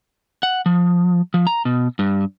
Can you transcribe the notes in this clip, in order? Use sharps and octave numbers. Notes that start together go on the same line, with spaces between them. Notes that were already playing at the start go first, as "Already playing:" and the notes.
F#5
F3
F3
A#5
B2
G2